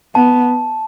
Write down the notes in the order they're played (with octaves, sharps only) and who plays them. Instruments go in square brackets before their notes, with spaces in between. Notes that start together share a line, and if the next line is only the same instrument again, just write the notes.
[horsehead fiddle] B3 [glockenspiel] A5